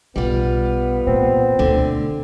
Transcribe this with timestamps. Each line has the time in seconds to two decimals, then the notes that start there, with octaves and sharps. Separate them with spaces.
0.16 B1 B2 G3 B3 F4
1.07 A#2 E3 C4
1.59 D2 B2 D3